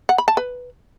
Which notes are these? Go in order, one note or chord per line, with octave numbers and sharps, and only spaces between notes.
F#5
B5
A5
B4